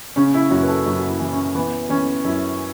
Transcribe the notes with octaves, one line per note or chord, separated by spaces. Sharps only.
C#3 C#4
E4
F#2 F#4
B4
A4
F#2 F#4
F#4
E4
E3
C#4
E3 B3
E3 C#4
F#2 E4